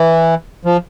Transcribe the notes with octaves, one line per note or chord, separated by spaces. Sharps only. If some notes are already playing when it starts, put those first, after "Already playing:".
Already playing: E3
F3